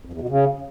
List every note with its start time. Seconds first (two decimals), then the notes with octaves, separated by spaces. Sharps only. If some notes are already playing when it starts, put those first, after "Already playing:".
0.05 F2
0.13 E2
0.21 B2
0.29 C#3